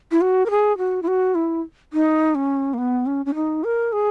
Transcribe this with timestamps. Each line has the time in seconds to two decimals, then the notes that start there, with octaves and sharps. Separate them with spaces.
0.12 E4
0.21 F#4
0.46 A#4
0.50 G#4
0.78 F#4
1.02 E4
1.07 F#4
1.35 E4
1.93 D#4
2.35 C#4
2.74 A#3
2.78 B3
3.06 C#4
3.26 C#4
3.35 D#4
3.64 A#4
3.92 G#4